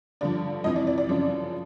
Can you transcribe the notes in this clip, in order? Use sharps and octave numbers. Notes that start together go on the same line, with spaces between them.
G2 D3 F3 D5
F2 C3 E3 D#5
D5
D5
D5
F#2 C#3 F3